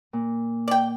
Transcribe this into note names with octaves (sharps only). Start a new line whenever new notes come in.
A#2
D5 G5